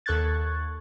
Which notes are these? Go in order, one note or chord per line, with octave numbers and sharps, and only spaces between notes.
D#2 A4 C#6 F#6 G#6 A6